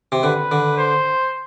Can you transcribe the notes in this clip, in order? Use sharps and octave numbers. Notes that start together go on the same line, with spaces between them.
C3
D3 B4
D3
C5